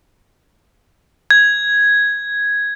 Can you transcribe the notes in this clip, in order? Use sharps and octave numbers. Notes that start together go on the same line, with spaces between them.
G#6